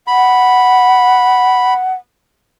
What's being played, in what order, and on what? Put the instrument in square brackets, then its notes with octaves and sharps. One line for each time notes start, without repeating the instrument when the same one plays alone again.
[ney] F#5 [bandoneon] B5